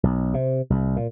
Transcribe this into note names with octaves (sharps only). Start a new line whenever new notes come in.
B1
C3
C2
A#2